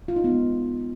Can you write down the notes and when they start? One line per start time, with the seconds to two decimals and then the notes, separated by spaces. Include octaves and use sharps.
0.08 F4
0.16 D#4
0.24 B3
0.32 G#3